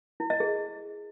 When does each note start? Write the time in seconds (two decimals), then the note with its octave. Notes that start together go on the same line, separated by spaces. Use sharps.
0.20 E4
0.30 D#5
0.40 G#4